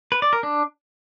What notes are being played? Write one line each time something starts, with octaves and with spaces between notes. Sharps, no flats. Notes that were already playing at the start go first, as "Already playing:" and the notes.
B4
D5
A#4
D4